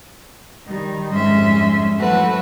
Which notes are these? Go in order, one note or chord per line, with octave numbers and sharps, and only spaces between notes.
D#3 G3
F2 G#2 G3 C#4 E5 C6
E3 F#3 A3 F#4 B4